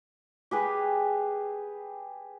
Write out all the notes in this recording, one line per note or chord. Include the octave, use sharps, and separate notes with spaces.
G4 G#4 B4